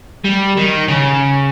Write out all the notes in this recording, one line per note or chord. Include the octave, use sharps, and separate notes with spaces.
G3
D#3
C#3